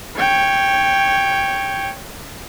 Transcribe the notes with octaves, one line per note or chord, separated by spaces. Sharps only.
C#5 G5